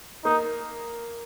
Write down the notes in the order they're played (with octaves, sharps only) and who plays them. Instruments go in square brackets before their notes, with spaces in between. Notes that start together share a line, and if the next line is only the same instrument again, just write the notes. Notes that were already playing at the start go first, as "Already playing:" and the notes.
[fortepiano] A#3 [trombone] D#4